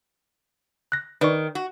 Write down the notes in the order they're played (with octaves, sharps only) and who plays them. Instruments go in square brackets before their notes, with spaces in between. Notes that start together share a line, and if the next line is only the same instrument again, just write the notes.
[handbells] F#6 A#6
[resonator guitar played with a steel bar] D#3 [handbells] B4 D5 C#6
[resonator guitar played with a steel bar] F#4